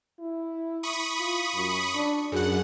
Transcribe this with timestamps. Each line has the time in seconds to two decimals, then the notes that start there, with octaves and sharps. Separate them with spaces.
0.20 E4
0.83 B5 C#6 D#6
1.20 F4
1.55 F#2
1.95 D4
2.32 F#2 G#4 F#5